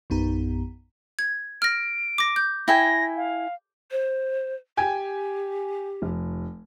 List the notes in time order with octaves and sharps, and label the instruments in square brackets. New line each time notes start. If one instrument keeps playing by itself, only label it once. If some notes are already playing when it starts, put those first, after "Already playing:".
[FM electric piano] A#1 F#2 B3 D#4 G4 A#5
[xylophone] G#6
[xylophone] F6 A#6 [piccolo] D7
[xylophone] D6 A#6
G6
[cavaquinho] E4 G5 G#5 [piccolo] A#6
[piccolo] F5
[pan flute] C5
[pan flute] G4 [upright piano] G5 G#5 G#6
[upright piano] F1